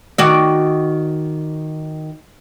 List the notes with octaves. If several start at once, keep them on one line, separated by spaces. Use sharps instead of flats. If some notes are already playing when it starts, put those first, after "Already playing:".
D#3 F#4 D5